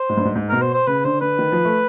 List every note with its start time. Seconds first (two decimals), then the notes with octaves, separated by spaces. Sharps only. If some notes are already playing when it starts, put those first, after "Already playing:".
Already playing: C5
0.09 G#2
0.17 G2
0.25 G#2
0.35 G#2
0.49 B2 A#4
0.61 C5
0.74 C5
0.87 C#3 B4
1.04 D3 C5
1.21 D3 B4
1.39 D#3
1.52 F3
1.65 A3